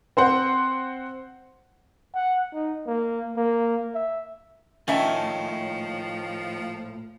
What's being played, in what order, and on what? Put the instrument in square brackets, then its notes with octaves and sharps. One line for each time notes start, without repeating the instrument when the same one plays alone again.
[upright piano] C4 C5 F#5
[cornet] F#5
D#4
A#3
A#3
E5
[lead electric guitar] A2 [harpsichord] D#3 [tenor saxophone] F3 [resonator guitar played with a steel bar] C#4 E5 A5